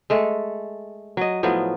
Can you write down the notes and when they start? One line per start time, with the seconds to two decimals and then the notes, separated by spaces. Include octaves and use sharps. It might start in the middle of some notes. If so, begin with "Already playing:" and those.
0.10 G#3 A3 A4
1.17 F#3 D#5
1.43 A2 F3 F#3 B3